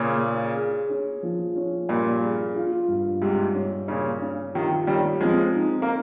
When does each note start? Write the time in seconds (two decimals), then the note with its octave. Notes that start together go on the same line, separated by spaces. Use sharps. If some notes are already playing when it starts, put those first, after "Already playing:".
Already playing: A#2 C#3 G#4
0.23 G#4
0.56 G#4
0.90 C#4
1.23 F3
1.56 C#4
1.88 G2 A#2 A#3
2.22 G#4
2.55 F4
2.88 G2
3.22 G#2 C3 G3
3.55 C#4
3.88 A#2 C#3 C#4
4.22 C#4
4.54 C3 D#3 F4
4.87 D#3 G3 C#4
5.21 F3 G#3 C4
5.54 D#4
5.82 A#3